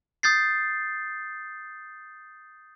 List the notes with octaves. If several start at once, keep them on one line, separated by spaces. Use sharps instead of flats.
D#6 G6 A6 C7